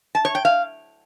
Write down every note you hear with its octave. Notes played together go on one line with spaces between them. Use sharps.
A5
C#5
G5
F5